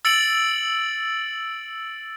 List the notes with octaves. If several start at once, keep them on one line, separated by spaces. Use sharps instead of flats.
E6 A6 C#7 D7 F#7